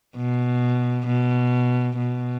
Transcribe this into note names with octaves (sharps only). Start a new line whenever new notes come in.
B2
B2
B2